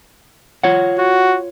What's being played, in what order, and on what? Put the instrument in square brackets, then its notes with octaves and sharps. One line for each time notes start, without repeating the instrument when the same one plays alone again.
[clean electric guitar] F4 C#5 F#5
[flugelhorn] F#4